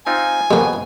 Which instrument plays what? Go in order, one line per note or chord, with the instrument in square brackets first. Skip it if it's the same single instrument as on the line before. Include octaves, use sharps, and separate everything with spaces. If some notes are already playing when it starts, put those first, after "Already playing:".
[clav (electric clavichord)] C4 D#4 F4 [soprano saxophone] G#5
[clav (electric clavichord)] F2 B2 [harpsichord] G#3 A#3